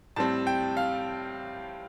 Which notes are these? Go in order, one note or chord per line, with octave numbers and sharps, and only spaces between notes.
A2 G3 C4 A5
G5
F5